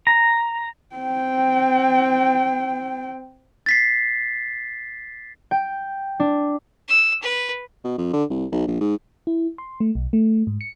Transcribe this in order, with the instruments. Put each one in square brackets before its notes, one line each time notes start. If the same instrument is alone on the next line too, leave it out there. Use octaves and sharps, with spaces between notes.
[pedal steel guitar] A#5
[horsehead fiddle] C4 G5
[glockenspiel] A6 B6 C7
[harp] G5
D4
[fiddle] E6
B4
[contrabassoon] B2
F2
D3
C2
B1
A#1
G#2
[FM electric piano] E4
C6
A3
B1
A3
G#2
C#7